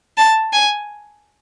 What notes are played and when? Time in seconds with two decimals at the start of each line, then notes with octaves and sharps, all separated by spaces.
0.17 A5
0.53 G#5